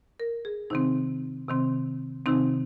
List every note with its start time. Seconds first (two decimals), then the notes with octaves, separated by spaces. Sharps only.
0.20 A#4
0.45 G#4
0.70 C3 D#3 C4 D#4
1.48 C3 D#3 C4
2.26 C3 D#3 C4 D#4